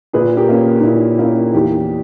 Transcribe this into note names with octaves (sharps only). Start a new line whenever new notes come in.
A#2 G#4 B4
G4 A#4
A#3 C#4
D#4
A#2 E4
A#3 C#4 E4
E2 D#4 G4